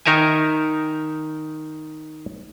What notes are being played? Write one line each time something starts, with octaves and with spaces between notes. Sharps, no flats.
D#3 D#4 A#4 E5 G#5